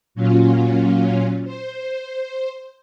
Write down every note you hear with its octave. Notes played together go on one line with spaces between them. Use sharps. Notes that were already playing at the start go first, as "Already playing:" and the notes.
A#2 F#3 C#4 F4
C5